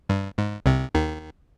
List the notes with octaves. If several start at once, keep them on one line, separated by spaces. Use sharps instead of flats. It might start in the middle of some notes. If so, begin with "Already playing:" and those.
G2
G#2
C2 C3
D#2 D#3